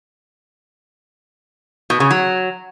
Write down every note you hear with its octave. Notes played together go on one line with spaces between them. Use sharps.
B2
C#3
F#3